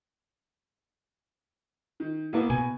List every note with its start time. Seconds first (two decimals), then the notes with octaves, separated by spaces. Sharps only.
2.00 D#3
2.33 A2 A#3 B3
2.50 B2 G#5